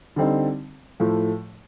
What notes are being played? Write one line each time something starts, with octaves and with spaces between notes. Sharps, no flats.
D3 G3 C4 D#4
A2 F3 A3